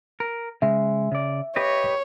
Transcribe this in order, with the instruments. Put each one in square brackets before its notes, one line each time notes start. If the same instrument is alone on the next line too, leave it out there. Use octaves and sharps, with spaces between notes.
[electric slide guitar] A#4
[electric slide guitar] C#3 G#3 [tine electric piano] E5
[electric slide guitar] C#3 D5
[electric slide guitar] G4 B4 D#5 [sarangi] C#5